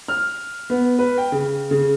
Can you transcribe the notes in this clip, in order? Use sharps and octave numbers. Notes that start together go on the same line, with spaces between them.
F6
B3
B4
G5
C#3
C#3